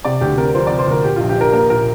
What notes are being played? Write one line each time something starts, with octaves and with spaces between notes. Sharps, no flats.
C3 D5
D2 G4
C4 A#4
F3 C5
D5
C3
C5
D2 A#4
A#2 G4
F4
A#1
G4
D4 A#4
A#3 A#4
A#2 A#4